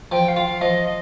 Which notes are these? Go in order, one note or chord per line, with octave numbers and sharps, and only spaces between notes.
F3 G5
F5
F4
F5
F3 D#5